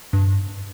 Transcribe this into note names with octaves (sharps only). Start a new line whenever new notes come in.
G2